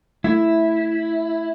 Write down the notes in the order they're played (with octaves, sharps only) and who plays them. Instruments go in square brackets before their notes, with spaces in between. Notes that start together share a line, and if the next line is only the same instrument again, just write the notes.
[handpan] A3 [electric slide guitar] E4